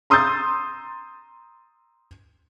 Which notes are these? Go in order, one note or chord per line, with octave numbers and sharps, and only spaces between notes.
A#5 C6 D#6 E6 G6 A6